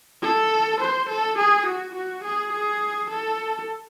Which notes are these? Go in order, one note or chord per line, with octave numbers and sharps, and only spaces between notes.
A4
C5
A4
G#4
F#4
F#4
G#4
G#4
A4